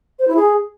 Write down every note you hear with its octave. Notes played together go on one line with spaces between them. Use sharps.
C5
E4
G#4